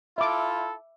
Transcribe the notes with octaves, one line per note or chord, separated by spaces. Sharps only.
E4 F4 A4 E5 D6